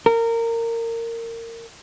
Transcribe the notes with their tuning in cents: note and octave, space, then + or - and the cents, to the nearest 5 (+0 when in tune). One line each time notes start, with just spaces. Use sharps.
A#4 -20